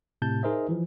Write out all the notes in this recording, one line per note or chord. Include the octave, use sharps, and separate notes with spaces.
A2 C3 A5 G6
D#4 G#4 A#4 C5 D#5 E5
E3 F3